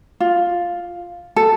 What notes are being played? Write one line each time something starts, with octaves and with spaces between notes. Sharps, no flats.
F4
A4